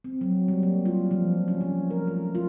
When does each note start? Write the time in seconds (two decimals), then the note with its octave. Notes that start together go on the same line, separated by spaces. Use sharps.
0.04 C4
0.21 F#3
0.48 G3
0.63 A#3
0.86 F4
1.11 F3
1.48 C#4
1.61 F3
1.91 A#4
2.07 A3
2.35 F4